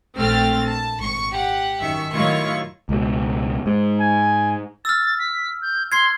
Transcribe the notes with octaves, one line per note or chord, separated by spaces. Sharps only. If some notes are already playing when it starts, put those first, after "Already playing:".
A#1 A3 C4 G5 F6 A6
A5
G#1 C#6
G4 F#5
F#2 D#3 E5 C#6
A2 D#3 F#3 E4 F4 C#6
C#2 B2
G#2
G#5
E6 F6 A6
B6
G6
C6 G#6 C7